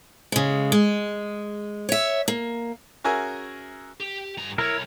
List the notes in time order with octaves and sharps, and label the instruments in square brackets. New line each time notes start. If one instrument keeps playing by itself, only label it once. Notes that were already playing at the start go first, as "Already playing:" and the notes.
[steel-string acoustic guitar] C#3 G#3
G#3
C#5 E5
A#3
[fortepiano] C#4 F#4 G#4 A#4 E5 G#5
[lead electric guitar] G4
G2 A#5
[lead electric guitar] B1 C#5 [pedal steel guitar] E4 A#4